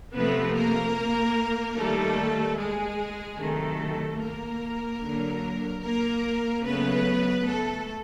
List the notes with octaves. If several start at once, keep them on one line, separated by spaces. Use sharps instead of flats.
C3 F3 A3 B3 B4
A#3 A#4
D#3 G3 A3 A#3 A4
G#3 G#4
C3 D#3 F#3 A3 A4
A#3 A#4
D3 F#3 A#3
A#3 A#4
C#3 F#3 A3 B3 B4
A3 A4